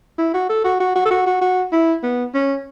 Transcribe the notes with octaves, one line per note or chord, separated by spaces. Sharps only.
E4
F#4
A4
F#4
F#4
F#4
A4
F#4
F#4
F#4
E4
B3
C#4